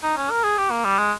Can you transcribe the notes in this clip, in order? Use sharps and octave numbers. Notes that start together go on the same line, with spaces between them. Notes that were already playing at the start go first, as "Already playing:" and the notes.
D#4
C#4
A#4
G#4
G4
A#3
G3
G#3